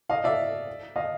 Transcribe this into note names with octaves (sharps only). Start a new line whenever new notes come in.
D#5 F5
D5 E5
D#5 F5